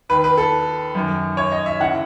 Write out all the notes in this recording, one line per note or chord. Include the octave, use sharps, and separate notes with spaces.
D#2 D#3 B4
B4
A4
F#2 D#3
C#5
D#5
E5
D#2 C#3 E3 F#5